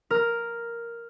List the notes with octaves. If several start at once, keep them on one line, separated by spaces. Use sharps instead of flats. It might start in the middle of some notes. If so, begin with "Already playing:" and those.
A#4